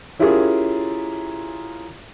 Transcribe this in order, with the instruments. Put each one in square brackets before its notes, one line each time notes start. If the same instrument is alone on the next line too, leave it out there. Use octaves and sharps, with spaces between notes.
[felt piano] C#4 E4 F4 G4 G#4 A#4